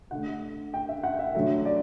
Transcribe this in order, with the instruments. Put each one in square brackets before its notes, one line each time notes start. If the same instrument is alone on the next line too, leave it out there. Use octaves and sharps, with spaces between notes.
[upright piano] D3 A3 F#5
G5
E5
F#5
E5
D3 F#3 A3
D5